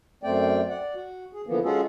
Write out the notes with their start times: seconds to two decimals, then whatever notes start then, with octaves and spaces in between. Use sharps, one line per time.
0.23 F#2 A3 C4 D5 G5
0.70 D5 F#5
0.95 F#4
1.33 G#4
1.47 D3 E3 F3 A#3 B3
1.64 G#3 C#4 F4 F#4 G#4 A4